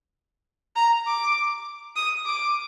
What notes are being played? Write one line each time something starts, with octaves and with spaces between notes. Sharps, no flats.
A#5
D6
D#6
D6